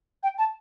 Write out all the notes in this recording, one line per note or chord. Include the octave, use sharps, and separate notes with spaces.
G5
A5